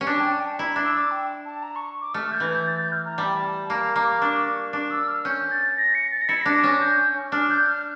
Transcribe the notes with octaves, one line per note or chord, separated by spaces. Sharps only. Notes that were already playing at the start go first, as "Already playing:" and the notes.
C#4
D4 A5
G5
A5
G5
A5
E4 A#5
D4
E6
D6
G5
A5
A#5
C#6
D6
A3 F6
G6
E3
G6
A6
G6
F6
A#5
G3 A5
G5
A5
A#3 A5
A#5
A#3 D6
A#5
D4 C#6
D4 D6
E6
F6
C#4 G6
A6
A#6
C#7
A6
A#6
E4 C#7
D4 A#6
A#6
C#4
G6
D4 F6
G6
F6